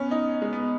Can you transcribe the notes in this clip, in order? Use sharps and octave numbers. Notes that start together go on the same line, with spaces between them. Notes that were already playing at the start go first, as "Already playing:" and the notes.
Already playing: B3 C#4
D#4
G#3
B3